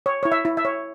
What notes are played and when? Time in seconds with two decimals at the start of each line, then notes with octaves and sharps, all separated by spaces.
0.06 C#5
0.23 E4 C#5
0.32 E5
0.45 E4
0.57 E5
0.65 C#5